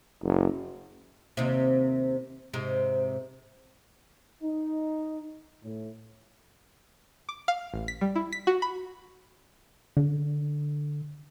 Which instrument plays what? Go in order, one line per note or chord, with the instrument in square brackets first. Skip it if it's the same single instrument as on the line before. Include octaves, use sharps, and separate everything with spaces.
[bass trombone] F#1
[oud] D#2 C3
G#2 C3
[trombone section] D#4
A2
[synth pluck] D6
F5
A1
B6
G3
E4
B6
F#4
B5
[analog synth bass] D3